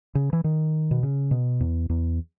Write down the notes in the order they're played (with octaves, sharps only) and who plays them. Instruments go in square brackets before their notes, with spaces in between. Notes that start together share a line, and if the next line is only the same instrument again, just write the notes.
[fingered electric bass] C#3
E3
D#3
B2
C#3
B2
E2
E2